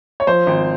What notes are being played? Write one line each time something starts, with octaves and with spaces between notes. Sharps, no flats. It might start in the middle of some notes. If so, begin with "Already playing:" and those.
C#5
F3 C5
G#1